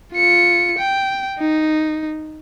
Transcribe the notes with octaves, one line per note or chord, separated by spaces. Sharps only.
F4 C#7
G5
D#4